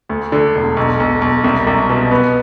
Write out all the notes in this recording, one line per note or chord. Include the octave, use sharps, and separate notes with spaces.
D2
D3
E1
B1
B1
B1
C2
C2
B2
B3